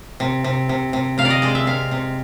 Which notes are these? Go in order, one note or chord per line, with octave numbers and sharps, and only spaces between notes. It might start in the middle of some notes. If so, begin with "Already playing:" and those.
C3
C3
C3
C3
C3 F5
D5
D#5
G#3 D5
E5
C3 F5
C3